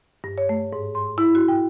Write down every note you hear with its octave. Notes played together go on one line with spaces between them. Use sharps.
G2
C#5
A3
G#2
C6
E4
F#4
G5